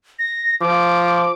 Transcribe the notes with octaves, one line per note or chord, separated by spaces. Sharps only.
A#6
F3 D6